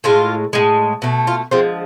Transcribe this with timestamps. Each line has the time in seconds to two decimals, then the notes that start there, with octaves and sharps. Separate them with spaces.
0.04 A2 G#3 F4
0.53 A2 G#3
1.02 B2 A3
1.27 F4
1.51 D3 F3 G#3 C4